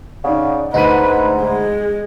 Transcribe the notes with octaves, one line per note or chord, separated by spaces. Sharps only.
C#3 D#4 D5 F#5
D2 G#2 D#4 B4 B5 F#6 D#7
G#3